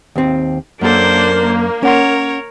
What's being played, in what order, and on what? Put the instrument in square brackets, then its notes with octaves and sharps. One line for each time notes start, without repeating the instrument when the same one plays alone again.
[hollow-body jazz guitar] D#2 C4
[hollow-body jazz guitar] F#2 A4 [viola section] A#3 [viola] D4 C5
[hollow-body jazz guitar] C#4 F#5 C6 [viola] A#4 C#5